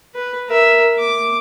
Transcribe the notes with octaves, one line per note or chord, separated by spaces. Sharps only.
B4
A#4 E5
D6